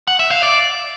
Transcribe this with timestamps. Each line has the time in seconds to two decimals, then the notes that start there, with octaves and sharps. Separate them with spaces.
0.08 F#5
0.19 E5
0.31 F5
0.43 D5